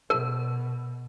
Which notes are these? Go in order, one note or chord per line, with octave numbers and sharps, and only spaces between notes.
B2 A#4